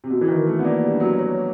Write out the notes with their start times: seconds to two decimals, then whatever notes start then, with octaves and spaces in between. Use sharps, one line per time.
0.04 C3
0.10 B2 F#4
0.21 E3
0.28 D#3
0.37 A#4
0.47 A3
0.59 B3
0.65 A#3 D5
0.83 G3
0.91 D4
1.00 F#3
1.19 C#5